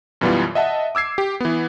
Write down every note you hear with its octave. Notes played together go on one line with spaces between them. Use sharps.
F#2 B2 E3 G3 B3 F4
D#5 E5 F#5 A5
D6 E6 G#6 C7
G4
E3 B3